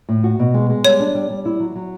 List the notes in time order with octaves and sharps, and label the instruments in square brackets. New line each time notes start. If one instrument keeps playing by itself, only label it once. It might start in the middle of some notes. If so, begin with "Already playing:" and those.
[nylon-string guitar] A2
F#4
B2
G#3
G#3
[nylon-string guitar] G3 [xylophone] C#5
[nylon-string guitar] D4
G3
G3
E4
F#3
F#3